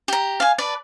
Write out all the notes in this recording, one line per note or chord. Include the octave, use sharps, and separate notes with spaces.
G4 A#5
F5 G#5
B4 D5 A5